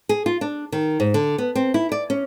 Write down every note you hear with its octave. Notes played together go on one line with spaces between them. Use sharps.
G#4
F4
D4
D#3
G#2
D3
B3
C4
E4
D5
C#4